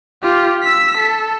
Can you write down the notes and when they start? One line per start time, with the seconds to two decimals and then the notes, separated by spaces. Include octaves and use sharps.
0.23 F4 G4
0.63 E6 B6
0.98 A4